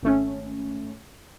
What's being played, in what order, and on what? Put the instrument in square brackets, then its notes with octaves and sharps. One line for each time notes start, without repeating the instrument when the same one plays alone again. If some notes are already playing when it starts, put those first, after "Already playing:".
[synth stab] G#1 A3 C#4